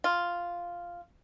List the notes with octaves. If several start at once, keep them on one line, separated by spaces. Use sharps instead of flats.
F4